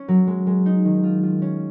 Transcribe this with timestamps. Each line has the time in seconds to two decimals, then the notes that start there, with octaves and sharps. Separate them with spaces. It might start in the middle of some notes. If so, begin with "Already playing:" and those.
Already playing: C#4
0.08 F#3
0.27 G#3
0.47 G#3
0.66 D#4
0.85 D#3
1.04 F4
1.23 F4
1.42 C#4